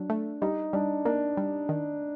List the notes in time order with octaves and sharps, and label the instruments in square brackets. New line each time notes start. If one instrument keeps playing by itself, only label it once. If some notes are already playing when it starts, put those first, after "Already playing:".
Already playing: [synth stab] F#3 [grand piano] D4
[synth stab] A3
[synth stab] G3 [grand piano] D#4
[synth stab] G3 [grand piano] D4
[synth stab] A#3 [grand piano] D4
[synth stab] G3
D#3